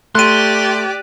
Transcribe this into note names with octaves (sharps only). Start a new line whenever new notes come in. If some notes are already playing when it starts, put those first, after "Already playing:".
A3 G4 D5 C6 F#6 D#7